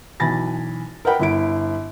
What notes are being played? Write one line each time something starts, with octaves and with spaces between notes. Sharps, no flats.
B1 E3 G#5 B5 A6 A#6
A#4 B4 D#5 F#5 G5 B5
G1 E4 D7